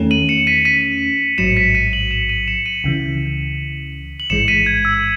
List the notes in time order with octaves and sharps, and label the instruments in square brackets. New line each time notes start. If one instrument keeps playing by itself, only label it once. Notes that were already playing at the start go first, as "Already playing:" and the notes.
Already playing: [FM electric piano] E2 D#3 A3 C#4
[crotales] D#7 F#7
C#7 E7
B6 D#7
B6 D#7
[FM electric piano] A1 G#2 F#3 [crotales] C#7 E7
[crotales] B6 D#7
B6 D#7
D#7 F#7
C#7 E7
D#7 F#7
C#7 E7
D#7 F#7
[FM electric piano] C#2 C#3 E3
[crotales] F#7
[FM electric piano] A1 G#2 E3 G#3 [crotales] C#7 E7
[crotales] B6 D#7
G#6
E6